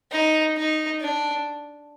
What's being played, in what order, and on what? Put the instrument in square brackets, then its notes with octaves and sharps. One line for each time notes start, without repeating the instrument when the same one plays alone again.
[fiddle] D#4
D#4
D4